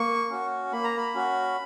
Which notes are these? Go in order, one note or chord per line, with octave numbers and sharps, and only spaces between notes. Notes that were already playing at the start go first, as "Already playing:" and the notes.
Already playing: A#3 C#6
C#4 F#4
A#3 B5
A#5
B5
C#4 F#4